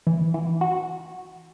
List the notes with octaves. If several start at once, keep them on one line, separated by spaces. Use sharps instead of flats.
E3
E3
F#4